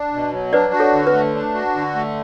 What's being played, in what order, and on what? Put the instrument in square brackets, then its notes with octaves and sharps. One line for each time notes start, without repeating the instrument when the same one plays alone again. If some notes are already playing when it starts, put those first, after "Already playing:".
Already playing: [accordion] D4
B2
F#3
[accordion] D4 [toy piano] B4 D5
[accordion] F#4
[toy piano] A4 C#5
[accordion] D3
[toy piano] B4
[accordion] A3
D4
F#4
D3
A3